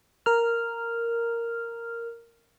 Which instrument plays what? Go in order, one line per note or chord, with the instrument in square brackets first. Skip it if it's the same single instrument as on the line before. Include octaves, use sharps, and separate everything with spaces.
[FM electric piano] A#4 F6